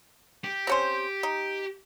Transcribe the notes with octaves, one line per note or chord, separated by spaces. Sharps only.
G4
C4 C#4 C5
D#4